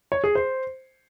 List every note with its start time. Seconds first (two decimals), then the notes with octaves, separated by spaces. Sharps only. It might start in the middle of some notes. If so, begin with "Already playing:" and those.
0.12 C#5
0.24 G#4
0.35 C5